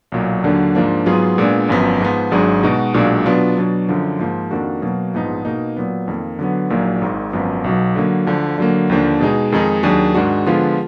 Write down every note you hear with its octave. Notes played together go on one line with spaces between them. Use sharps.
B1 A#2 F#3
D#2 D3 F#3 A#3 D4
G#2 F3 A#3 D4
G#2 F#3 B3 F4 G#4
A#2 G#3 B3 D4
G#1 F#2 F3 B3
G#2 F3 B3
G#1 G#2 F#3 D4 G#4
B2 G#3 D#4 F#4
B1 A#2 G#3 D4 F#4
B2 F#3 B3 D4 F4
B2 F#3 D4
F#2 D3 F3
G#2 F3 A#3
F2 D#3 A#3 D4 F#4
B2 F#3 A#3
A#1 G#2 F3 B3 D#4
B2 A#3 D#4
A#2 F#3 B3
F2 D#3 A#3
D3 F#3 B3
A#1 A#2 F#3 A#3 D#4
G#1 G#2 D#3
G#1 F#2 F3 B3
B1 B2 F#3
D3 F#3 A#3
D2 D3 F3
D3 F#3 A#3
D#2 D3 F3 A#3 D4
B2 G#3 D#4 G#4
F2 D#3 G#3 D#4 G#4
D#2 D#3 F#3 D4 G#4
G#2 D#3 G#3 D4 F#4
D3 F3 G#3 B3 F4